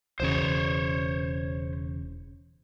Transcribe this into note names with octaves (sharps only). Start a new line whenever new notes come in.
E1 E2 C#3 C5 C#5